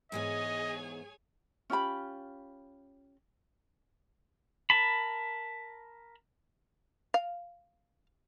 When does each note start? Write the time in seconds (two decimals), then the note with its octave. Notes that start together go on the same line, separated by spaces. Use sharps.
0.12 G#2 E3 B3 G#4 C#5 D#5 G#5
1.70 C#4 F4 G4 B5
4.70 A#4 A5 B5
7.14 F5